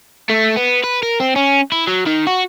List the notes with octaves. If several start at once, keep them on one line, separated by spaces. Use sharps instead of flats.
A3
B3
B4
A#4
C4
C#4
E4
F#3
D#3
F#4